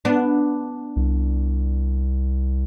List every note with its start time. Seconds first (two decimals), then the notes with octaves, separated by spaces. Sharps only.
0.05 B3 D4
0.96 C2